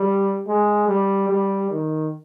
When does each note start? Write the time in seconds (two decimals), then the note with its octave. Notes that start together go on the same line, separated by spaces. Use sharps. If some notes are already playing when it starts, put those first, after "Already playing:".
Already playing: G3
0.48 G#3
0.88 G3
1.29 G3
1.71 D#3